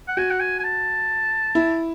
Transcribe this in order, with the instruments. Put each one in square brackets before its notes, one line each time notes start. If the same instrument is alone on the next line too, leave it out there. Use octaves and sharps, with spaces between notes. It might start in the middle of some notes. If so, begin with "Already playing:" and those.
[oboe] F#5
[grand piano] F#4 [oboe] G#5
[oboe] F#5
G#5
G#5
A5
[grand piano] E4